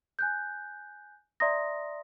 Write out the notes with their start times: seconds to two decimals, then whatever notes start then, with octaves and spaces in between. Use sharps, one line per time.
0.19 G#5 F#6 G6
1.40 D5 E5 A#5 C6 D#6 A#6